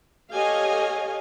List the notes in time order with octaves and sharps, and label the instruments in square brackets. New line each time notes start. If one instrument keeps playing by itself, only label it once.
[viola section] G4 A4 C#5 D#5 F5 G#5